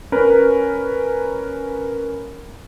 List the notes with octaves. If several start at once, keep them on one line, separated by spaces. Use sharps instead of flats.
C#4 A#4 B4